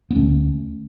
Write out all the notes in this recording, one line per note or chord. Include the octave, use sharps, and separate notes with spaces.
B3
D2 D3 A3 C#4